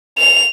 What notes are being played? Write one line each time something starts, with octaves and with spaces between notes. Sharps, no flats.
F7